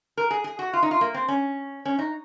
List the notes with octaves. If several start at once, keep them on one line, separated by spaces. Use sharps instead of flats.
A#4
G#4
G#4
F#4
F4
D#4
F4
A#3
C4
C#4
C#4
D#4